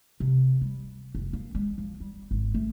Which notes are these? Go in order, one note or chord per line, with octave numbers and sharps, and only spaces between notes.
C3
G3
F1
A#3
G#3
F3
G3
G#1
A3